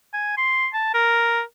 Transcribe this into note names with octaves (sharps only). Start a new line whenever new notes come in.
G#5
C6
A5
A#4